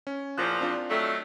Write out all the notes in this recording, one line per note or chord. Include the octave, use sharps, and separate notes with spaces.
C#4
E2 A#2 F3 F#6
C4 D4 F4
D#3 F#3 A3